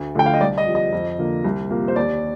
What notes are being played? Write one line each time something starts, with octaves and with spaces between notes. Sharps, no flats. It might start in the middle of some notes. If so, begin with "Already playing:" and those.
Already playing: D2
D3 F3 A3 G5
F5
D#5
C2 D5
D#5
C3 F3
D#5
F2
D3 F3 A#3
C2
C3 F3 A#3
C5
D#2 D5